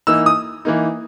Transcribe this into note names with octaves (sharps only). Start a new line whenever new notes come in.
E3 A#3 D#4 E6
D#6
E3 A#3 D#4